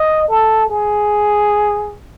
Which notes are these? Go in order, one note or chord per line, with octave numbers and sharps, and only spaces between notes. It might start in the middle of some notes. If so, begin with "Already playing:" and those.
Already playing: D#5
A4
G#4